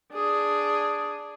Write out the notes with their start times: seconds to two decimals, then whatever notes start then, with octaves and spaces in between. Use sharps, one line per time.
0.13 D4 G#4